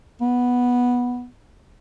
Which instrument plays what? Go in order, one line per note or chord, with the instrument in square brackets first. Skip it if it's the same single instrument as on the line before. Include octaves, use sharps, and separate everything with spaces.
[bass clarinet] B3